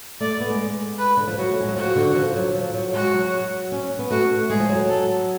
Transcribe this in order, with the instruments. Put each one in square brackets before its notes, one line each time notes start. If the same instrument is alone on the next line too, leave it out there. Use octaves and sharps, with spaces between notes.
[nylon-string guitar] A3 [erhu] D5
[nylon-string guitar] B3
G#3
[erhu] B4
[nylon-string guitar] D3
F3
[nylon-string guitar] F#3 [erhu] F#4
[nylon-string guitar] A3
G#3
F#3
[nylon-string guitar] F3 [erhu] F#4
[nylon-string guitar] D3
F3
F#3
F3
F#3
[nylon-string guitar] G#3 [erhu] F#4
[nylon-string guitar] F#3
C#4
B3
[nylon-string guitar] A3 [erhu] F#4
[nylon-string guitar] G#3 [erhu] G#4
[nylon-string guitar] F3
F#3
[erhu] A4